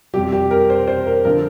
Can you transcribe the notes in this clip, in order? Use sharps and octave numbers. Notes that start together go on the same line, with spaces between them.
F2 C3 G3 G4
G4
A#4
C5
C5
A#4
D3 F3 A#4